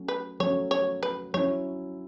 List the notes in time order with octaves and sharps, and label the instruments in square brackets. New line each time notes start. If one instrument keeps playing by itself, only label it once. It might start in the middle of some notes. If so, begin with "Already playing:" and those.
Already playing: [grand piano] F#3 A3 C#4
[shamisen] B4
[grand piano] F#3 A3 C#4 [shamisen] C#5
[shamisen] C#5
B4
[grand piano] F#3 C#4 E4 [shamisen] C#5